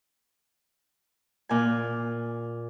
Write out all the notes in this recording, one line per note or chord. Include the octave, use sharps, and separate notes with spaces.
A#2 G#5